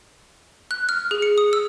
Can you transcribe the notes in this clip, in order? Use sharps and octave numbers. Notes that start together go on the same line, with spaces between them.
F#6
F6
G#4
C#7
D#6
E6